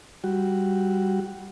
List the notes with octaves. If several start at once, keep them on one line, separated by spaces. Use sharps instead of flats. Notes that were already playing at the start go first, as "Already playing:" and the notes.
G3 F#4